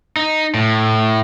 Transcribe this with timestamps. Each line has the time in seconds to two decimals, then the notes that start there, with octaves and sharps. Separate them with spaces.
0.17 D#4
0.55 A2